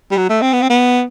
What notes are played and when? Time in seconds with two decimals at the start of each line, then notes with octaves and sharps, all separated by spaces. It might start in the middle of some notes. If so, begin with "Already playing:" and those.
0.11 G3
0.17 F#3
0.30 A3
0.41 C4
0.53 B3
0.62 C4
0.70 B3